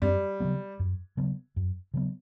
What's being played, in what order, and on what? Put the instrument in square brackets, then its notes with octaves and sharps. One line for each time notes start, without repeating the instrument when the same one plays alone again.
[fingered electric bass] F#2 [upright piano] G3
[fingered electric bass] C#3 F#3 B3
F#2
C#3 F#3 B3
F#2
C#3 F#3 B3